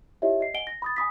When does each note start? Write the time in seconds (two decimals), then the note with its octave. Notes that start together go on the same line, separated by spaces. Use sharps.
0.22 E4 F4 G4 C#5 D#5 E5
0.41 D#5 C7
0.54 D#5 F#5 G#5 D7 G7
0.67 A#6
0.82 B5 D#6 A6
0.97 G#5 B5 D#6 B6